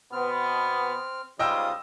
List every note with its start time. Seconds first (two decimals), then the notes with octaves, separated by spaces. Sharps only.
0.13 B2 B3 C4 F6
1.39 G#2 C#3 G3 F4 D#5 G5 D#6 E6